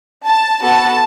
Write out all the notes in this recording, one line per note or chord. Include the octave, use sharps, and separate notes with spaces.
A5
B3 F#4 A4 A5